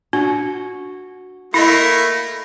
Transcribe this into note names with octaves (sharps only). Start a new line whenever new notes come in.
D4 F#4
A3 A#3 E4 D#5 B5 A#6